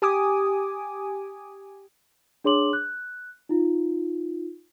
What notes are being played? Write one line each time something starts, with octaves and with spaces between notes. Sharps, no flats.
G4 G#5 D6 D#6
D4 G#4 C#5 C6 D6 F#7
F#6
D#4 F4